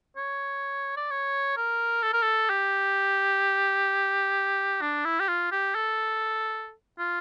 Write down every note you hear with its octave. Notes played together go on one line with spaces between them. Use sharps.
C#5
D5
C#5
A#4
A4
A#4
A4
G4
D4
E4
G4
F4
G4
A4
F4